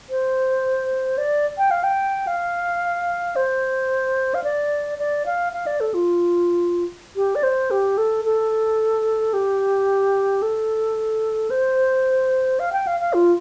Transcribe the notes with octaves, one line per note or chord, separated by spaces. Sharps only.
C5
D5
G5
F5
G5
F5
C5
F5
D5
D5
F5
F5
D5
A4
F4
G4
D5
C5
G4
A4
A4
G4
A4
C5
F5
G5
F5
F5
F4